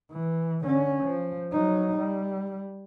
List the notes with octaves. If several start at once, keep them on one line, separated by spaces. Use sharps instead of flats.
E3
D3 C#4
F3
F#3 D#4
G3